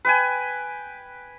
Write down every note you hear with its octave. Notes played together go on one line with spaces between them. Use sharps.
B4 G5 G#5